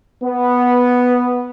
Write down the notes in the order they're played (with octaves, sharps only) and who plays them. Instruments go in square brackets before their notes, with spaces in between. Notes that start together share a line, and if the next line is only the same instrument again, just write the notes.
[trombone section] B3